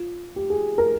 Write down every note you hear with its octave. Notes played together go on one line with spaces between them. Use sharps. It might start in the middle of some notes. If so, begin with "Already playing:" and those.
Already playing: F4
G4
G#4
A#4